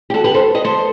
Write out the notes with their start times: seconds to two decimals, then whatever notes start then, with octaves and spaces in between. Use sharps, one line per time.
0.10 G4
0.14 F#4 A4
0.24 G4 B4
0.34 A4 C5
0.54 B4 D#5
0.64 A4 C5